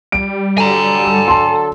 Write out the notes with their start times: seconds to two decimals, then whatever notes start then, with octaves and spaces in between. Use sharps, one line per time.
0.12 G3 D7
0.58 D3 F#3 A4 G#5 A#5
1.28 A5 C6